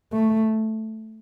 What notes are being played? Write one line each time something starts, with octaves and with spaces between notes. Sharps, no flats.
A3